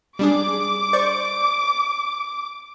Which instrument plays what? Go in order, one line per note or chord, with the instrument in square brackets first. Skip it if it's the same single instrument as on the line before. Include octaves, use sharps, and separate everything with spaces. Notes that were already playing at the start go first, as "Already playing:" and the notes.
[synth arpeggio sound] G3 D4 G#4 [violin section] D6
[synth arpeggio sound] C5 D5 C#6